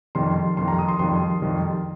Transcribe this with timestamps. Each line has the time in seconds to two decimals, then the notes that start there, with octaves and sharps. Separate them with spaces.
0.15 F2 D#3 G3 C6
0.57 F2 D#3 G3 C6
0.68 A#5
0.79 D#6
0.89 C6
0.99 F2 D#3 G3 C6
1.41 F2 D#3 G3